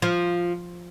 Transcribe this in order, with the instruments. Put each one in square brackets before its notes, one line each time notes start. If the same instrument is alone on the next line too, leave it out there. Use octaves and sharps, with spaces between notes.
[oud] F3